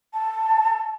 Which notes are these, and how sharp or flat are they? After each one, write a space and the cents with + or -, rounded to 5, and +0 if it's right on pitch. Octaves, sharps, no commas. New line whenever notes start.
A5 +10